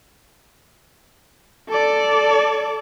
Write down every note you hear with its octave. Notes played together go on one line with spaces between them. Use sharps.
A4 D5